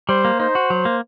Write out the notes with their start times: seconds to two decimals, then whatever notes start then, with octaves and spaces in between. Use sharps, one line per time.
0.09 G3 C5
0.25 A#3
0.40 D#4 C5
0.55 F#4
0.70 F#3
0.85 A#3